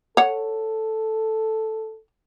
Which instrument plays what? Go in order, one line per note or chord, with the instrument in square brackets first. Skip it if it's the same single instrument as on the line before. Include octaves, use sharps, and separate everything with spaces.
[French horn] A4 [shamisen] C#5 F#5